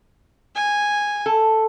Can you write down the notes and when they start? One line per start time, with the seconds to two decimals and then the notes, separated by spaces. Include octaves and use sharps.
0.56 G#5
1.26 A4